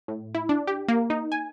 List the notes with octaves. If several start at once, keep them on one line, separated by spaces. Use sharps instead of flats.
A2
E4
D4
G4
A#3
D#4
G#5